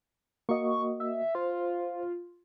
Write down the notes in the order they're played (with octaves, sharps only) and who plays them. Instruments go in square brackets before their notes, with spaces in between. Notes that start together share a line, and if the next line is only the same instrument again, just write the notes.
[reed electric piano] A#3 F#4 D#5 [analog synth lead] C#6
[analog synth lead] E5
[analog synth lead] F4 [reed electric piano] C5